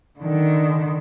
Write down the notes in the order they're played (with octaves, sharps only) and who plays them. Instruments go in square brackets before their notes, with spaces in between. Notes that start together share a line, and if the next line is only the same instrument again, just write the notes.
[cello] D3 D#3